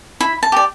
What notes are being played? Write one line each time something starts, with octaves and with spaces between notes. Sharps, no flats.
E4 B5
A5
G4 D5